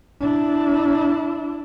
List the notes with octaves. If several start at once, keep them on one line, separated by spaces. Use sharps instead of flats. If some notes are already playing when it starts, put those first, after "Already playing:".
D4 E4